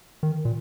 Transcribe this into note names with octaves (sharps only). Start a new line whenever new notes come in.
D#3
A#2